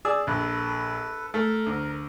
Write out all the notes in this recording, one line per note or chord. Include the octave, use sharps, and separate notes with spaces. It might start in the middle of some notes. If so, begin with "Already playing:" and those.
G#4 D5 E6
A#1 A4 B4
A3 A#4
D2